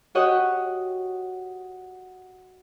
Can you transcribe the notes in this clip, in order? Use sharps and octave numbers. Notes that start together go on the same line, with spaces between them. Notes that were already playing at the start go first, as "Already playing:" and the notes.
F#4 G4 C#5 D#5 F#5